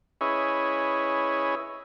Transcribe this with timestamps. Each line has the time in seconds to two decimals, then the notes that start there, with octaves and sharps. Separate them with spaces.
0.21 C#4 E4 G#4 B4 C#5 D#5